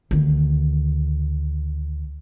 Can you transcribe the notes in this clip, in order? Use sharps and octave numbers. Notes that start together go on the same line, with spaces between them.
D2 D#3